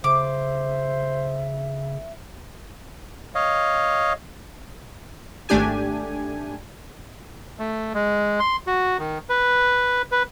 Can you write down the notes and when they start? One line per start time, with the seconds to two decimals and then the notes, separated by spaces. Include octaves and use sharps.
0.04 C#3 C5 E5 D6
3.35 C#5 D#5 F5
5.49 G#1 A3 D4 G4 G#5
7.59 A3
7.94 G#3
8.40 C6
8.67 F#4
8.99 D#3
9.29 B4
10.11 B4